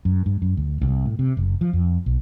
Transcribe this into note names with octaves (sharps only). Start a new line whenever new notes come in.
F#2
G2
F#2
D2
C2
A2
C3
F#1
F3
F2
B1